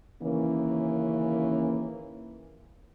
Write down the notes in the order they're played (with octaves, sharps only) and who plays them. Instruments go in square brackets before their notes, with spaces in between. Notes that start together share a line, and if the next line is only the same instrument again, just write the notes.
[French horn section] D#2 C#3 E3 A#3 C#4